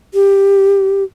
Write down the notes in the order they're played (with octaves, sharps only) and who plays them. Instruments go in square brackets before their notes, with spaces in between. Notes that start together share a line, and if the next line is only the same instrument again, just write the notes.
[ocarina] G4